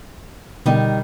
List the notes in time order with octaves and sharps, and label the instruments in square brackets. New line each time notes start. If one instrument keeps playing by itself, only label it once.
[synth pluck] B2 D3 [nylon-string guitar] D#3 G3 D#4